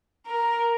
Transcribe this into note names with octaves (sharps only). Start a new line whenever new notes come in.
A#4